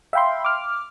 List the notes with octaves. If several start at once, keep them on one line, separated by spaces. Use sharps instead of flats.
E5 F5 G5 B5 C6
D6 F6